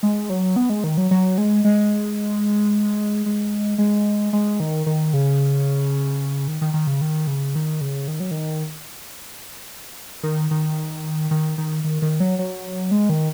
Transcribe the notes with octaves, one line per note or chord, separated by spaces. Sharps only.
G#3
F#3
B3
G#3
D#3
F#3
F#3
G#3
G#3
G#3
G#3
G#3
D#3
D#3
C#3
D#3
D#3
D#3
C#3
D#3
C#3
D#3
C#3
D#3
F#3
D#3
D#3
D#3
D#3
D#3
D#3
D#3
F#3
F#3
G#3
D#3